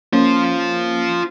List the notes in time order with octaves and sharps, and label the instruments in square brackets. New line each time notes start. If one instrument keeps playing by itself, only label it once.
[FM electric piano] A#3 C#4 [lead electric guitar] F4 C5